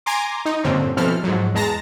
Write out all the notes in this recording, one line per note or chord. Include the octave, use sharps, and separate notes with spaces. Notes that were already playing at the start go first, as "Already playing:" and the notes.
G#5 A#5 C6 D6
D#4
G2 A#2 D3 C4 C#4
B2 E3 F3 C4 A4 F6
G#2 F3 F#3
E2 G#3 A5 A#5 A#6